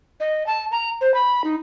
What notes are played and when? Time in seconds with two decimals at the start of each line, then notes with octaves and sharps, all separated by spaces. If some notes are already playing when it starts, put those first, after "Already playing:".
0.20 D#5
0.47 A5
0.72 A#5
1.01 C5
1.14 B5
1.44 D#4